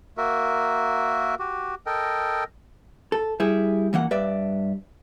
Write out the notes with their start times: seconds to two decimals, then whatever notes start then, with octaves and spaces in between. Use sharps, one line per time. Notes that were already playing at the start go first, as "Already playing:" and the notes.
0.17 A#3 F#4 A#4 E5
1.39 F#4 G4
1.86 A4 A#4 D#5 G5
3.12 A4
3.40 G3 E4 G#4
3.93 F#2 E3 A#3 F#5
4.11 G2 B4 D5 E5